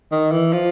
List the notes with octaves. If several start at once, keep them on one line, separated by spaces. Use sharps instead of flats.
D#3
E3
F3